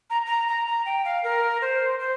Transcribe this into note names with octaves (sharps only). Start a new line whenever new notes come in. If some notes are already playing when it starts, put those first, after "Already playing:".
A#5
A#5
A#5
A#5
G5
F5
A#4
C5
C5